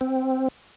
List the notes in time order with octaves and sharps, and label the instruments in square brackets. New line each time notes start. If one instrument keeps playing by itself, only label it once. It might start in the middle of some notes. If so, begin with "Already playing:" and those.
[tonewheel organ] C4